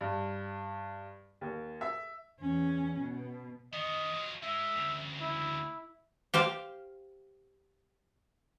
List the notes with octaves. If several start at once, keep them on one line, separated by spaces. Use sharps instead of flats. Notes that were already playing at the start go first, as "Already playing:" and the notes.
G2
D#2
E5
E2 C#4
B2
D#3 B3 D#5
F#3 F4
G#3 D#4 E5
D2 C#3
E4
G4 C5 F5